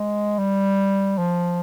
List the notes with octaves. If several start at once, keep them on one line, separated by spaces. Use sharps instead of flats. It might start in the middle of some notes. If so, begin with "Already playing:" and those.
Already playing: G#3
G3
F3